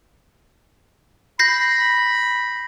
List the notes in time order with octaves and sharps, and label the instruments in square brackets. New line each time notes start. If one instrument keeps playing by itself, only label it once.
[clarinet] B5 [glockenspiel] G6 A#6 C7